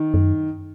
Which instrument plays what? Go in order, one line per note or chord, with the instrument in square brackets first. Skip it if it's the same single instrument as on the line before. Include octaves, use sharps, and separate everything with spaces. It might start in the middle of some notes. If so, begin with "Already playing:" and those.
Already playing: [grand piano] D#3
[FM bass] F#2